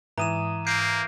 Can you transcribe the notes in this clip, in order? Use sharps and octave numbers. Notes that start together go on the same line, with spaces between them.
G#2 E3 A#5 D#6 D#7 E7
A#3 G6 C7 D7